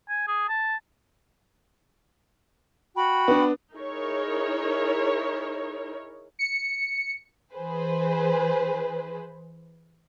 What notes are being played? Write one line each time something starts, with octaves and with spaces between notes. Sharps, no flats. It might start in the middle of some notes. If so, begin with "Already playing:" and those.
G#5
G#4
A5
F#4 G5 B5
B3 D4
D#4 E4 G#4 A#4 C#5
C#7
E3 G#4 B4 C5